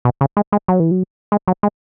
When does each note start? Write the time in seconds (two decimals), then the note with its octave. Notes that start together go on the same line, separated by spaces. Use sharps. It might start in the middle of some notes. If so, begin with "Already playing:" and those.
0.05 B2
0.21 C#3
0.37 G#3
0.52 G#3
0.68 F#3
0.80 E3
0.91 F#3
1.32 G#3
1.48 F#3
1.63 G#3